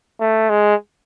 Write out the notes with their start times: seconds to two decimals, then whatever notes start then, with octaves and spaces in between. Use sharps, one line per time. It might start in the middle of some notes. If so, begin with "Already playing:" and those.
0.21 A3
0.49 G#3